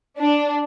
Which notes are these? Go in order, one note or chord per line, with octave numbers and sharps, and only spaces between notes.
D4